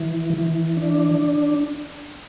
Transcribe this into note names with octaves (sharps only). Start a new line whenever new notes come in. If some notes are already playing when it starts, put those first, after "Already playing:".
Already playing: E3
E3
D4